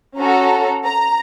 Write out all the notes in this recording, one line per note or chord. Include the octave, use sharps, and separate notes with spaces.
C#4 F#4 A4 A#5
A#5